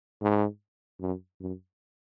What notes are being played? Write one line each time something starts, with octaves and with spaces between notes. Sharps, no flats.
G#2
F#2
F#2